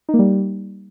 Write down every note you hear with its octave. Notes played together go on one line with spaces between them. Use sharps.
D#4
A#3
G3